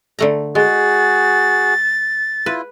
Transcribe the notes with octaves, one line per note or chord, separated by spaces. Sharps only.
D3 A3 A#5
G#3 F#4 G#4 A6
E4 F4 B4